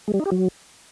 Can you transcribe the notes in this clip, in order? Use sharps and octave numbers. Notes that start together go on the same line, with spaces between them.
G#3
G3
D#4
G4
F#3